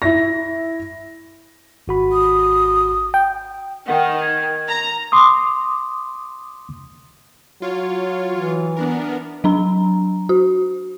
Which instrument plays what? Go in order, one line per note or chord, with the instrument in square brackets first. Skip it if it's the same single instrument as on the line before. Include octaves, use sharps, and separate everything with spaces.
[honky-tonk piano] E4 A#6
[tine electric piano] G#1 F#4 B5
[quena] D#6
[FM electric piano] G5
[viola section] D#3 [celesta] F#5 G5
[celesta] G#6
[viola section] A#5
[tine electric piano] C6 D6 D#6
[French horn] F#3 [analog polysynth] F4 C#5
[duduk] E3
[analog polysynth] B3 D4 A#4
[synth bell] F#3 D4 A#5
F#4